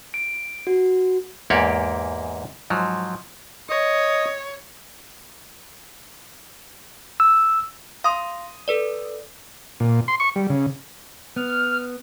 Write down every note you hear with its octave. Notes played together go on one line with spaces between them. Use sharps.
D7
F#4
E2 G#2 A#3 G4 C#5 D5
G#2 F3 F#3
C#5 D#5 D#6
E6
F5 C6 D#6
A4 B4 D5
A#2
C6
C#6
G3
C#3
B3 F6